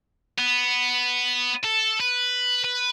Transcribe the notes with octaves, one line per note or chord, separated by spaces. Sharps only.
B3
A4
B4
B4